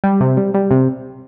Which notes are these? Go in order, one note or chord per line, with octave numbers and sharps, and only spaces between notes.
G3
C3
G3
G3
C3